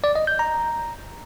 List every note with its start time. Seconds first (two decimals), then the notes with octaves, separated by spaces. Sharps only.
0.04 D5
0.16 D#5
0.27 G6
0.39 A#5